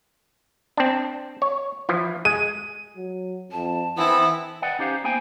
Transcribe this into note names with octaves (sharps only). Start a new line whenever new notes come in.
C4 D4
C#5
E3 F3
G#3 D#7
F#3
F2 A5
E3 B3 C4 E4 A4 G#5
B4 D5 D#5 F#5 G5
C#4 D#4 G4 C5 F5
A#3 B3 C5 G5 G#5